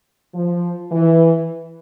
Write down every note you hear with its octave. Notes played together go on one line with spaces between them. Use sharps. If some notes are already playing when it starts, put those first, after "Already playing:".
F3
E3